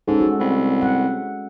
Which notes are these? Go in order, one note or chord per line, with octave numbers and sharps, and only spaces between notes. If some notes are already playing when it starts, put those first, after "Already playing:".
G#2 C#4 A4
G#3 F#4
C2
F#5